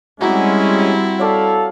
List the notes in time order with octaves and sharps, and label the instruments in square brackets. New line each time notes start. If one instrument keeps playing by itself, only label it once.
[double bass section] G3 [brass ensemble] G#3 C#4 [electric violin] C4 E4 [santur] F#4 A#5 D6
[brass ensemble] A4 F5 [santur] C#5 D5 B5